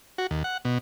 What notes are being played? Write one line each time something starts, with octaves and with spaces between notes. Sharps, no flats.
F#4
D#2
F#5
B2